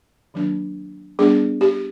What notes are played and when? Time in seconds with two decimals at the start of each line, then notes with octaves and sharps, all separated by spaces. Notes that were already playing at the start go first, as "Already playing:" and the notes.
0.34 D#3 F#3 A#3 D4
1.19 G3 B3 D4 G#4
1.61 G4